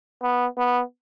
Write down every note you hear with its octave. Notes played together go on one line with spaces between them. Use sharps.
B3
B3